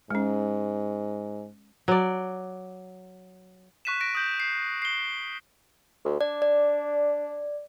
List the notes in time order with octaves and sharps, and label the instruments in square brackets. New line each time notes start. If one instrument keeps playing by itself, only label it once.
[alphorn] G#2 [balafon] G#3 C#4
[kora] F#3 D5
[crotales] C#6 F#6 B6 D#7 E7
A#6 D7
D#6 G6 F#7
C7
C7 G7
[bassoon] D2
[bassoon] D4 [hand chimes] D5
[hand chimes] D5